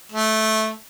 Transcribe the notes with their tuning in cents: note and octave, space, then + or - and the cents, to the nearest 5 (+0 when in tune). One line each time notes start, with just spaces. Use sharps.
A3 -10